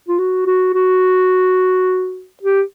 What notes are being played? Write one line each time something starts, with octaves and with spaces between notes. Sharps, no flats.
F4
F#4
F#4
F#4
G4